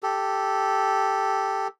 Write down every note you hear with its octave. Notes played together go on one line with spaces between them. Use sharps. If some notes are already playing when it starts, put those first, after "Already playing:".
G4 A4